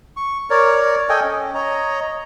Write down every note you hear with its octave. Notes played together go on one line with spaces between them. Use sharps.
C#6
A#4 C#5 D5
A4 D#5 G5 G#5
C#4
C#5 D#5 A#5